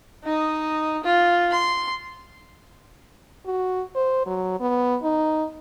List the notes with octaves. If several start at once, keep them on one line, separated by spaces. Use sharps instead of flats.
D#4 D#5
F4
C6
F#4
C5
F#3
B3
D#4